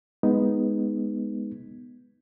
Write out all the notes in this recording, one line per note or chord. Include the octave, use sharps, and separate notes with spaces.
G#3 B3 D#4